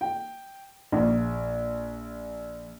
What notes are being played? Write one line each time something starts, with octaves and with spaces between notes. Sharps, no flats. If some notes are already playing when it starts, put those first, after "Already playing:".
G5
A#1